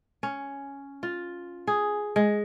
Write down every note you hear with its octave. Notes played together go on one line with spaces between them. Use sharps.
C#4
F4
G#4
G#3